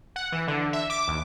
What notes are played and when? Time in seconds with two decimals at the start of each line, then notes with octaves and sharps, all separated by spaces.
0.16 F#5
0.32 E3
0.48 D3
0.73 E5
0.90 D6
1.08 D#2